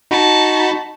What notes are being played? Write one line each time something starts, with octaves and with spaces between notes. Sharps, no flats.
D#4 F#4 A5 B5